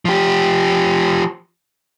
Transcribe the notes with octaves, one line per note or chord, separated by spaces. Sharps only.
F3 G4